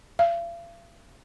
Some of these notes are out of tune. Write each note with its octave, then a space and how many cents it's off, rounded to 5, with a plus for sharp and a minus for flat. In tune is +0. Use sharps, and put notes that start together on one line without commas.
F5 -45